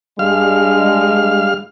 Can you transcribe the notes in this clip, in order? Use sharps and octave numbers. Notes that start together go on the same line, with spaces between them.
G2 G3 G#3 D4 F5 F6